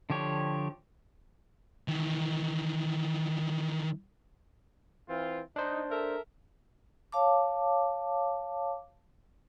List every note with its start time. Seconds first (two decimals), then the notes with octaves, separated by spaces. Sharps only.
0.10 D3 F3 G4 C#5
1.88 D#3 E3
5.08 E3 C4 F4
5.56 D4 D#4 C5
5.90 A4 A#4 E5
7.12 C#5 F5 A5 D6